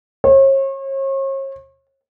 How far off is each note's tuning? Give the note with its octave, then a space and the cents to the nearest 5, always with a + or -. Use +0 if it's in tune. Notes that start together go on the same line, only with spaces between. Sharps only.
C#5 -40